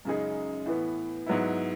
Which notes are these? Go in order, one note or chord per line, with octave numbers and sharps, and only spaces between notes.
F#2 C#3 G#3 D#4 G#4
A2 E3 B3
G#2 F#3 B3 E4